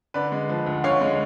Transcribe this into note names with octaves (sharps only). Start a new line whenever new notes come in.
D3 B4 D5
G#3
F3
D2
D3 C#5 F5
G#3